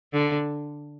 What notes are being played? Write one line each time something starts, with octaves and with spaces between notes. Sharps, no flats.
D3